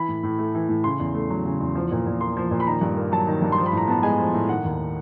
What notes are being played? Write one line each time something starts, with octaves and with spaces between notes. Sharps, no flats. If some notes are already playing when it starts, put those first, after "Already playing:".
Already playing: E3 B5
A2
A2
A3
E3
A2
C#3 C6
E2
A3
F#3
C#3
E2
F3
A#2
A#2
A#3 C6
F3
A#2
B5
D#3 A#5
G2
A#3
F#3 A5
D#3
G2
C6
F3
B5
A2 A#5
B3 A5
G#3 G#5
F3
A2
D#3 F#5
D#2